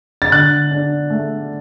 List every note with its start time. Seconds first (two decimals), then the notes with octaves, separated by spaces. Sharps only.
0.22 A6
0.32 D3 F#6
0.71 D4
1.10 A3